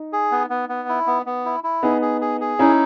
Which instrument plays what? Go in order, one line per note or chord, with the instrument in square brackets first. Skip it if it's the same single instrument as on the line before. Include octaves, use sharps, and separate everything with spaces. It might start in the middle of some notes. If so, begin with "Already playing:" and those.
Already playing: [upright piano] D#4
[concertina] G#4
B3
B3
B3
E4
B3
B3
E4
E4
[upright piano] B3 D#4 [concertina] G#4
[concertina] G#4
G#4
G#4
[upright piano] C#4 E4 [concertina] D#4